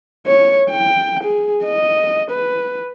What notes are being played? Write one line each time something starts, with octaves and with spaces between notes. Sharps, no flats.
C#5
G5
G#4
D#5
B4